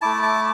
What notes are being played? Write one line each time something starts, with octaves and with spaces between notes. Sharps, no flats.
A3 E4 A5 D6
A5 D6